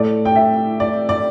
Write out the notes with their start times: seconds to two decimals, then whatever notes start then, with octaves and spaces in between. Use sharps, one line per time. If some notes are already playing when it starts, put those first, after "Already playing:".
Already playing: A2 A3 D5
0.25 G5
0.36 E5
0.80 D5
1.09 D5